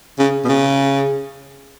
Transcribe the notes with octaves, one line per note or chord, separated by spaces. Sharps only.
C#3
B2
C#3